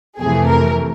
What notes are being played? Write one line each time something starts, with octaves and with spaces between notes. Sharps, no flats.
F2 C3 E3 A3 G#4
A#4